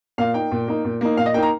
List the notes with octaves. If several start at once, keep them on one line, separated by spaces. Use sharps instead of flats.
A#2 F5
A#3 D#4 G5
A#2
A#3 D#4
A#2
A#3 D#4
A#2 F5
D#5
A#3 D#4 G5 A#5